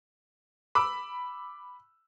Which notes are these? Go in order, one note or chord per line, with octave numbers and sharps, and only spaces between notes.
B5 D6 E6